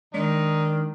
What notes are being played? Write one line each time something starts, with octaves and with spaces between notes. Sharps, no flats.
D#3 G#3 D4 D#4